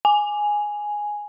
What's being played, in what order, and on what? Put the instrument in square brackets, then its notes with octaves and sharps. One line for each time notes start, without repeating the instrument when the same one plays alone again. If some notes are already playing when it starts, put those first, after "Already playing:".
[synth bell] G#5